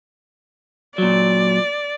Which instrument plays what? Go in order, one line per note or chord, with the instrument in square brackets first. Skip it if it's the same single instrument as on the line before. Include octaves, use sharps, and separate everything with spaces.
[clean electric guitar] A#2 F#3 [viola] D5